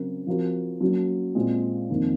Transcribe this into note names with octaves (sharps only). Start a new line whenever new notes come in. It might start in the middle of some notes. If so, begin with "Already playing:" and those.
Already playing: C#3 F#3 C4 F#4 A#4
F3 C4 F#4 A#4
F#3 A#3 C#4
A#2 G#3 C4 F4
F2 D#3 A#3 D#4